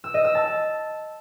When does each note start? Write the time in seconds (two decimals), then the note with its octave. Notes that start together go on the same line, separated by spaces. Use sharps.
0.04 E6
0.14 D#5
0.24 E6
0.35 A5